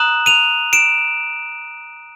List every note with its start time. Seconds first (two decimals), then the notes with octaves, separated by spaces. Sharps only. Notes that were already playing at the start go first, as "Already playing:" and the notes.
Already playing: A#5 D#6 F#6 E7 F#7
0.26 D#7 F7
0.73 D7 E7